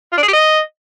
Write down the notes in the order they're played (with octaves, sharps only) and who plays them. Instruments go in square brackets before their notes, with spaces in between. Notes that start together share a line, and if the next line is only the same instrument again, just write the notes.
[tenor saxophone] F4
D4
G#4
G4
D#5